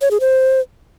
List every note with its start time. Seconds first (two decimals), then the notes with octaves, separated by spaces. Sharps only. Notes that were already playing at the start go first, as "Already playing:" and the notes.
0.01 C#5
0.11 G#4
0.20 C5